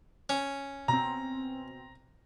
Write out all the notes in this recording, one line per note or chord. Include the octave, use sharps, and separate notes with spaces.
C#4
B2 C4 A#5